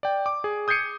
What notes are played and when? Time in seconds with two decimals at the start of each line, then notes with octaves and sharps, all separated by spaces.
0.03 D5 G5
0.26 D6
0.44 G#4
0.68 D#6 G6 G#6 C7 C#7 D#7